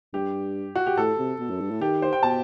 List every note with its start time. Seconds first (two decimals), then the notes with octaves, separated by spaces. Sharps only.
0.13 G2 G4
0.75 F#4
0.86 G4
0.97 A2 A4
1.18 C3
1.39 B2
1.50 F#2
1.60 G2
1.71 A2
1.81 D#3 G4
2.02 C5
2.13 G5
2.23 B2 A5